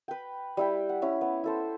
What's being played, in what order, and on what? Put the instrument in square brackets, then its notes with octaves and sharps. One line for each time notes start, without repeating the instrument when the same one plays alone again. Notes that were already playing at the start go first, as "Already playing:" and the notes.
[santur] B4 G5
G3 E4 G5
F#5
C#4 E4
B3
E4 A4 C5